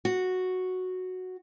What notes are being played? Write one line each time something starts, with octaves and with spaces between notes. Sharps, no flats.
F#4